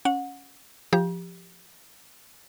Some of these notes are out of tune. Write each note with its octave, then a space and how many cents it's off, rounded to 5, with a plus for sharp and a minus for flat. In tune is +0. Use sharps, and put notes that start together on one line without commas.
C#4 +0 F#5 -25
F3 +0 G4 +10 A#5 +45